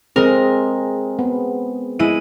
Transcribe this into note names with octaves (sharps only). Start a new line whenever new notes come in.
G#3 C4 G#4 A#4
B3
G#3 E4 D#7